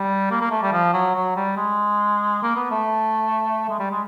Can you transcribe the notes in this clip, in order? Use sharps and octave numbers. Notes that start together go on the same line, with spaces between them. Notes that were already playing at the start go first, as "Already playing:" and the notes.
Already playing: G3
A#3
A#3
A3
G3
F3
F#3
F#3
G3
G#3
A#3
B3
A3
G#3
G3
G#3